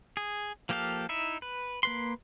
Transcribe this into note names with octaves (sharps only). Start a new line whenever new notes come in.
G#4
F3 A#3 G4 A4 F5
D#4 E4 E5
B4
A#3 B4 C6